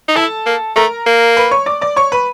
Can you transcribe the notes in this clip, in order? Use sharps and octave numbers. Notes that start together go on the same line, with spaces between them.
D#4
E4 A4 A5
A#3
A3 A#4 A#5
A#3
B4 B5
C#5 C#6
D5 D6
D5 D6
C#5 C#6
B4 B5